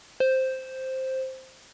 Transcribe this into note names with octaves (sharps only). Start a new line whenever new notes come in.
C5